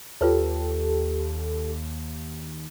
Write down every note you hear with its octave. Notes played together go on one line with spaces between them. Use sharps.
D#2 F4 G4 A4 B4 C#5